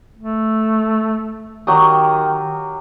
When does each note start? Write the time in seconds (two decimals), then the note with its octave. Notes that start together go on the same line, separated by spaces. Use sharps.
0.17 A3
1.67 D#3 F#3 G4 D#6